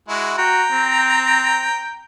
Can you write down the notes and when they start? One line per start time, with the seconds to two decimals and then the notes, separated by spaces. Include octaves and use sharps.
0.08 G#3 E4 F#4
0.38 F#4 G5 A#5
0.72 C4